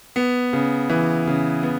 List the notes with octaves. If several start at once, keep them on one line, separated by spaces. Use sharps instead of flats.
B3
C#3
E3
C#3
B3